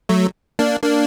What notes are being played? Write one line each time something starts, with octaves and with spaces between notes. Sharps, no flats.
F#3 A3
A#3 D4
A#3 D4